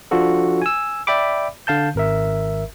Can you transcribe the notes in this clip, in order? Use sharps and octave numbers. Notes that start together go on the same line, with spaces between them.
F3 D4 F4 F#4 A4
G#5 E6
D5 E5 G5 B5 D6
D3 F5 A5 G6
G#1 A#4 E5